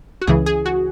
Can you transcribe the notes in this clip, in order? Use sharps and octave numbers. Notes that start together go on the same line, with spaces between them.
F#4
C#2 C#3 E3 G#4
G#4
F#4